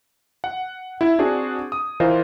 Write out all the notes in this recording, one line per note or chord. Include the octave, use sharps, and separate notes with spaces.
F#5
E4 G#6
C4 D4 F#4 G#4 C5 D5
D#6
E3 F4 A#4 C5 D#5